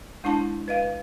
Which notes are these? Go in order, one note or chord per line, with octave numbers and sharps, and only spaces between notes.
G#3 D4 E4 A5 C6
B4 D#5 F5